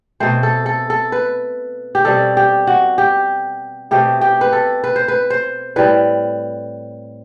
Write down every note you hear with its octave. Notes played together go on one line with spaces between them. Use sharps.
B2 A3 C4 C5
A4
A4
A4
B4
G4
B2 G3 C4 A4
G4
F#4
G4
B2 A3 C4 G4
G4
B4
A4
B4
C5
B4
C5
A2 G3 C4 B4